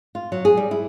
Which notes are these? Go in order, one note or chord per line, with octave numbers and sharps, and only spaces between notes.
F4
F#3
G#4
G3
E4